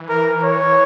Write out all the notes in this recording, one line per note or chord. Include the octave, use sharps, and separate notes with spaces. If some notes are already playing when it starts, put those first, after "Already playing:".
Already playing: E3
A#4
C#5